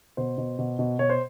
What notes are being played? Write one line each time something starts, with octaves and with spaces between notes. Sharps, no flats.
B2 C5
B2
B2
B2
B2 C#5
C5